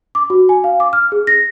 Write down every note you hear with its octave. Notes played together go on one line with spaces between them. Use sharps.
D6
F#4
G#5
F5
D6
F6
G#4
A#6